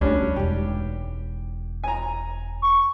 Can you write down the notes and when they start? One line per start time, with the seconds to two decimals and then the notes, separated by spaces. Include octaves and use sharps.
0.01 D2 F3 G3 C#4 D4
0.36 E1 D#4 G4
1.84 G#5 A#5
2.62 C#6